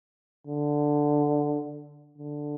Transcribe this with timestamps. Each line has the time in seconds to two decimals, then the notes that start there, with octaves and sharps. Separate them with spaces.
0.47 D3
2.18 D3